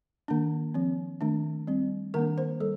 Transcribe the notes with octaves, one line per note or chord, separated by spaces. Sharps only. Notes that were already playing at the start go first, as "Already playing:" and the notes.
D#3 A#3 D4
F3 C4
D#3 A3 D4
G3 C4
D#3 A#3 D4 A#4
C5
G3 A4